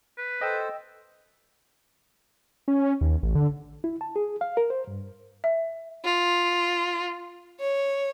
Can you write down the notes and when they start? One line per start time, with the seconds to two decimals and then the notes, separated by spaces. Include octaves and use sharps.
0.18 B4
0.41 A4 C5 D#5 G5 E6
2.68 C#4
3.01 D#2
3.23 A1
3.35 D3
3.84 E4
4.01 A5
4.16 G#4
4.41 F5
4.57 A#4
4.70 C5
4.87 G2
5.44 E5
6.05 F4
7.60 C#5